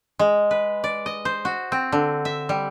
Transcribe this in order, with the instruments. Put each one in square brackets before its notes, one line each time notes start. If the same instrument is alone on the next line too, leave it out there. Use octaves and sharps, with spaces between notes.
[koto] G#3
B4
D5
D#5
C5
F#4
C4
D3
E5
G3